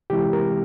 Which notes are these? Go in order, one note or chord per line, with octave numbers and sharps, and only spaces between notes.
C3 E3 G#3 C4 E4 G4
A#4